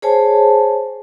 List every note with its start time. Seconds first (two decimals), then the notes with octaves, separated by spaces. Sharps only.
0.02 G#4 C5 C#5 G#5 A5